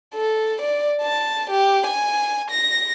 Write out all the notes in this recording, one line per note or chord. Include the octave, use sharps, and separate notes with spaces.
A4
D5
A5
G4
G#5
A#6